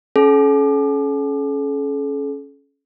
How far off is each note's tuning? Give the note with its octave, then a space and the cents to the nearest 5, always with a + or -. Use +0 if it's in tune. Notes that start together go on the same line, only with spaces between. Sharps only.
C#4 +0 A4 -45